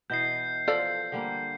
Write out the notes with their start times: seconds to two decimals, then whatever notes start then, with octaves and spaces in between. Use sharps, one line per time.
0.10 B2 E3 D#5 G6 C7
0.68 F3 A4 D5
1.12 D3 G3 A#3